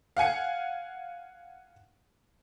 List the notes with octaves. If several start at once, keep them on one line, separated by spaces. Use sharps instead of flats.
F5 F#5 G#5 C#7